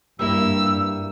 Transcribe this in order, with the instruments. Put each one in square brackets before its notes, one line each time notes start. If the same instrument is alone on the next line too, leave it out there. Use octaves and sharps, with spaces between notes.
[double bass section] G2 [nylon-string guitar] G3 A#3 E4 [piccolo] E6